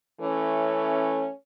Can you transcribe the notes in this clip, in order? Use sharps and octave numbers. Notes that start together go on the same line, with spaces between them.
E3 A3 C#4